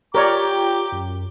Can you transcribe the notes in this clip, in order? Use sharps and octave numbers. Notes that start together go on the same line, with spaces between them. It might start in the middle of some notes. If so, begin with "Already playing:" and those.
F4 G4 A#4 C#5 D5 G5 A#5 D6
F#2